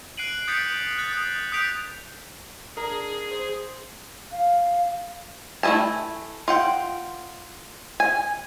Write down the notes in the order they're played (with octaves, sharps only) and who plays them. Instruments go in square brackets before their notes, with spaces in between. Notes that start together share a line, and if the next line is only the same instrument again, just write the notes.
[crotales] F#6 C7 D7 D#7 F#7
D#6 G6 A6 B6 C#7 D7
F#6 A6
D#6
D#6 F#6 G6 B6 D7 F7
[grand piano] D4 A#4 A#5 [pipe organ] G#4
[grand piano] C5
[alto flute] F5
[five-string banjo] A3 E4 D#5 G#5 A5
F4 F#5 G5
G#5